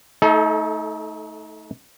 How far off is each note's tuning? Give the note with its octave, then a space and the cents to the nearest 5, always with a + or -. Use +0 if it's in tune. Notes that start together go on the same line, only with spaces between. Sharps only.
A3 -5 D#4 +30 A4 -30